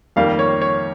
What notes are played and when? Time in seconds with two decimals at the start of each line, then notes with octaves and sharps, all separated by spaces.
0.16 F2 D#3 G3 A#3 F5
0.39 C#5
0.62 C#5